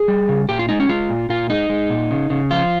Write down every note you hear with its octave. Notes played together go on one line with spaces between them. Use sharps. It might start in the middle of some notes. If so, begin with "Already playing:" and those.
Already playing: G#4
G3
C#3
A#2 G4
F4
G#3 D#4
C#4
G#3 F4
A#2
A#2 F4
G#3 D#4
G#3
A#2
C#3
C#3
F3 F4